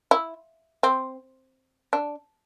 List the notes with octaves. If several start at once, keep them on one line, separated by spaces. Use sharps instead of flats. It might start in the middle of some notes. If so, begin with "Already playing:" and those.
E4
C4
D4